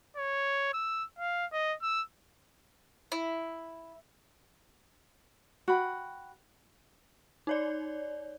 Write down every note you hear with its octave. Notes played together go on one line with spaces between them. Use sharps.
C#5
E6
F5
D#5
E6
E4
F#4 G5 B5
D#4 C#5 D5